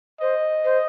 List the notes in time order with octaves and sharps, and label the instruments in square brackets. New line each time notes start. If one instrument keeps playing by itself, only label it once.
[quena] C5 [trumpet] D#5
[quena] C5